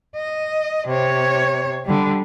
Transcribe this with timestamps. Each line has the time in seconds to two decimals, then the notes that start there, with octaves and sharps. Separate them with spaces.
0.16 D#5
0.88 C3 C#5
1.85 D3 G3